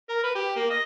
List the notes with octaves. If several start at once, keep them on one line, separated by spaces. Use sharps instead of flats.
A#4
B4
G4
A#3
D#5